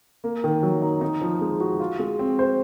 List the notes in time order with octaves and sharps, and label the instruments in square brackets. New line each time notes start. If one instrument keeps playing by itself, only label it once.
[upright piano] A#3
D#3
F#3
D#4
D#4
F3
G#3
F#4
F4
G#3
C4
C5